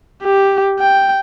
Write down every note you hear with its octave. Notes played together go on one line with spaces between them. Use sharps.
G4
G5